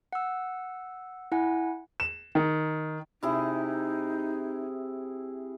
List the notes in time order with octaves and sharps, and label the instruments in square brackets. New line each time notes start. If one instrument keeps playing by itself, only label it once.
[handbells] F#5 E6
E4 F#5 G#5
[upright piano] E7
D#3
[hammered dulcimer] C3 E4 G#4 [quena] D#4